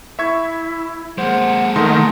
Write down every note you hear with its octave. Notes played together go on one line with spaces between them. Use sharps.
E4 E5 C#6 G#6
G#3 A#3 C5 F#5
D#3 A3 C6